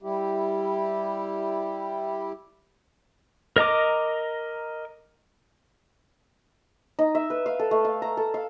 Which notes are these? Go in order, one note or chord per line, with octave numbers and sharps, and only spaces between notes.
G3 E4 G4
A#4 D#5 A#5 D6
D#4
E5
B4
F5
A4
A3
F5
A#5
A4
F5